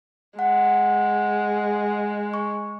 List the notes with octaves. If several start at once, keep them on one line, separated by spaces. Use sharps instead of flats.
G#3 F#5
C#6